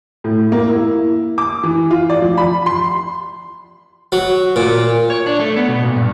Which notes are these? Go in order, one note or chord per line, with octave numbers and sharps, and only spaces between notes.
A2
A#3
E4
D6
E3
F4
D5
F3
B5
C6
F#3
A#2
C#5
D4
A3
B3
B2
A#2
G2